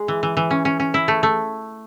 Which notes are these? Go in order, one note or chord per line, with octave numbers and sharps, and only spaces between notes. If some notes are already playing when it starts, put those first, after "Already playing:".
Already playing: G#3
E3
E3
E3
C#4
C#4
C#4
E4
A3
A3